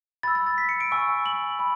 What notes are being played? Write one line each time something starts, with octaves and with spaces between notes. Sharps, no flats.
B5 E6 A6
A6
A6
B6
C#7
D7
G#5 C#6 E6
F#7
B5